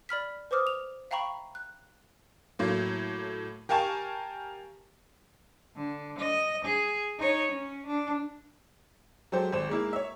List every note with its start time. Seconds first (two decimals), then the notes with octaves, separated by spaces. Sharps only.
0.09 D5 B5 F6 B6
0.51 B4 C5 D6 D#6 F6
0.67 F7
1.11 E5 F5 G5 A#5 B5 C#6
1.55 F#6
2.59 A2 F#3 A3 A#3
3.69 G4 A#4 F5 G#5 A5 C#6
5.76 D3
6.19 D#5
6.65 G#4
7.19 D#4 C#5
7.52 C#4
7.87 D4
9.32 F#3 G#3 G4 A4 C5
9.52 G#1 C5 E7
9.68 G#2 G#3 A#3 E4
9.93 C#5 E5